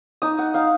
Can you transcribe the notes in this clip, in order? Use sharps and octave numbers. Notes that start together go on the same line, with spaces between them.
D#4 D#6
F#5
D#4 F5